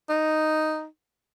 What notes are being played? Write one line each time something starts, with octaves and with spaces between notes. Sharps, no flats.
D#4